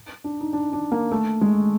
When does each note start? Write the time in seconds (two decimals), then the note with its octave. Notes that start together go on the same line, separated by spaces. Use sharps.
0.24 D4
0.41 D#4
0.53 D4
0.73 D4
0.92 A#3
1.12 A3
1.41 G#3